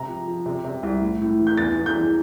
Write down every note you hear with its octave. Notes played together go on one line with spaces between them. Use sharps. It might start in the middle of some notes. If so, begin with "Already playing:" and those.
Already playing: C3 A#5
F3
F3
C3
C3
C2
A2
A2
E3
G6
E2 A6
E2
G6
E3